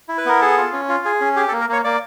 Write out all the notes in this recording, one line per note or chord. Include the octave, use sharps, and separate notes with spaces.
E4
B4
B3 A#4
G#4 A4
F4
C#4
F4
G#4
C#4
G4 G#4
A4
A#3
A#4
A#3 C#5
A#3 D5